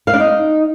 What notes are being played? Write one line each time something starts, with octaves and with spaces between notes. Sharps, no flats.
F5
D4
D#4